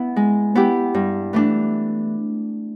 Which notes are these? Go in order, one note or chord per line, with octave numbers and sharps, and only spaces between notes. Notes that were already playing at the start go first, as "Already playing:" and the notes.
Already playing: B3 E4
G#3
B3 E4 G4
G2
E3 A3 D4